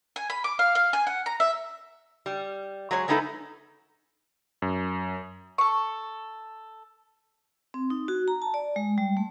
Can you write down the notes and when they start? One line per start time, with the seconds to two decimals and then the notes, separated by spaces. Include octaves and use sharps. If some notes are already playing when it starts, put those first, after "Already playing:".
0.16 G#5
0.30 B5
0.44 D6
0.59 F5
0.75 F5
0.93 G#5
1.07 F#5
1.26 A#5
1.40 E5
2.26 G3
2.91 F#3 G#3 C#5
3.08 G3 G#3 B3 D#4 E4 A4
4.62 F#2
5.58 A4 C#6
7.74 C4
7.90 D#4
8.08 F#4
8.28 A#5
8.42 A5
8.54 D5
8.76 G#3
8.98 G3
9.17 A3